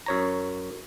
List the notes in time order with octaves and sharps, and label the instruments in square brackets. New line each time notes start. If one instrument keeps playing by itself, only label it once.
[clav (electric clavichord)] F#2 C#5 A#5